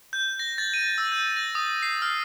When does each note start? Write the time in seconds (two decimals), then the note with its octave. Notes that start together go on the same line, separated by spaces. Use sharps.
0.13 G6
0.40 A#6
0.58 A6
0.74 D#7
0.98 E6
1.12 G6
1.36 A#6
1.55 D#6
1.83 C7
2.02 F6